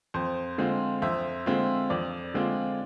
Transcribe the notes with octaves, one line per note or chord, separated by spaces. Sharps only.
F2 C5
D3 G#3 C4 F4
F2 C5 E5
D3 G#3 C4 F4
F2 D5
D3 G#3 C4 F4